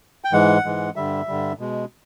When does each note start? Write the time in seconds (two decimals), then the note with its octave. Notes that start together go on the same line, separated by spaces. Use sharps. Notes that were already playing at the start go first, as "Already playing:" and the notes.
0.24 G5
0.32 G#2 E3 G#3 F#5
0.65 G#2 E3 G#3
0.96 G2 D3 G3 E5
1.27 G2 D3 G3
1.59 B2 G#3